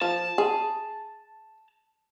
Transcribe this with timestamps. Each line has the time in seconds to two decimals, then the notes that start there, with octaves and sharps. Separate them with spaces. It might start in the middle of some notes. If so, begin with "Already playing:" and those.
0.01 F3 A5
0.38 G#4